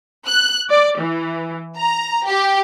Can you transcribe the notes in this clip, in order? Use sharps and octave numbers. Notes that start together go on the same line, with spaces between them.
F#6
D5
E3
A#5
G4